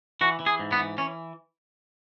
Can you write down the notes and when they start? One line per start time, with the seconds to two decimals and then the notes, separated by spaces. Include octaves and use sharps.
0.21 E3 F#4
0.40 E3
0.46 G#4
0.59 G#2
0.72 B3
0.79 E3
0.98 E3 C#4